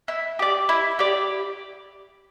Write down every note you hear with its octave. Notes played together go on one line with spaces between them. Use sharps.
E4
G4 D5
E4
G4 D5